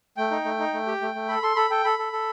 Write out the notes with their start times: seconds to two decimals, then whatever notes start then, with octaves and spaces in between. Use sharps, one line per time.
0.17 A3 G5
0.31 D#4
0.45 A3
0.59 D#4
0.74 A3
0.87 G4
1.02 A3
1.15 A3
1.29 A4 B5
1.43 A4 C6
1.56 A4 B5
1.70 A4 G5
1.85 A4 B5
1.99 A4
2.13 A4